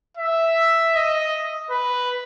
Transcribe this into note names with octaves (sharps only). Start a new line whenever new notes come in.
E5
D#5
B4